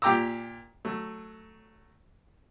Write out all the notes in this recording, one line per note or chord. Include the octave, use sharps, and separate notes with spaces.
A#2 G4 G5 A#5 D6 E6
F#3 A3